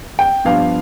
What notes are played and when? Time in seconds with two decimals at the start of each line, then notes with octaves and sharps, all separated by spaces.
0.19 G5
0.45 G2 F3 B3 D4 F5